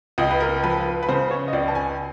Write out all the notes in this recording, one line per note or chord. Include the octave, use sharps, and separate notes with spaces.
C#2 D#5
B4
A#4
F3 B4
B4
B4
C#3 C5
C#5
D#5
C#2 D5
A5
G#5